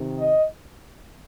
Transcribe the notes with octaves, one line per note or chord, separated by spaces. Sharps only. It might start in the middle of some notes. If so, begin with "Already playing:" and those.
Already playing: C3 D#3
D#5